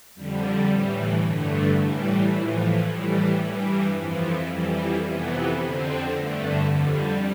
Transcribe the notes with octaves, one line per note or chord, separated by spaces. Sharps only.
F2 D3 G3
A2 E3
G2 D3 A3
A2 E3 G3
A2 E3 F3
A2 E3 G3
G2 E3 G3
F2 E3 F3
F2 E3 G3
F2 C3 E3 B3
F2 D3 C4
G2 D3 A3
F2 D3 G3